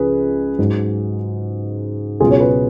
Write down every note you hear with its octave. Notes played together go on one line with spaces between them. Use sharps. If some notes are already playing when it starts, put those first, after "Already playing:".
Already playing: C#2 C#3 F3 G#4 B4
G#2 F#3
C#2 B2 F#3 F4 G#4
C#5
G#4 B4